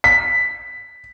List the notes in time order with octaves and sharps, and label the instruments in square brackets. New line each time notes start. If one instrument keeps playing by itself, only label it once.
[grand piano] B6